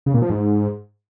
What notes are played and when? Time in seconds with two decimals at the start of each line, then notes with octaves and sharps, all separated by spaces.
0.06 C#3
0.14 A#2
0.22 F3
0.30 G#2